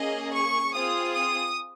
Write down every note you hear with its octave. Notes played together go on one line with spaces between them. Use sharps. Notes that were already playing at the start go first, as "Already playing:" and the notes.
Already playing: A#3 C#4 G#4 D#5
C#6
C4 F4 G#4 D#6
D#6